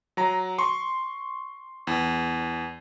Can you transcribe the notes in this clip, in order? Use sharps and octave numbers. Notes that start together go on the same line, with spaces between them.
F#3 A#5
C6 C#6
E2